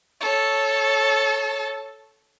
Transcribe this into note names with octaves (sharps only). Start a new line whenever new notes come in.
A4 C#5